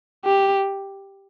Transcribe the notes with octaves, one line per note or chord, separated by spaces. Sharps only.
G4